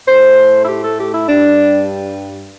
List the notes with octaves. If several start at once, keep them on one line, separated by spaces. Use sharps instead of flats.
A2 A3 C5
E4
G4
A4
G4
E4
G2 G3 D4